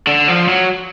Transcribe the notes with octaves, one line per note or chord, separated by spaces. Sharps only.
D3
F3
F#3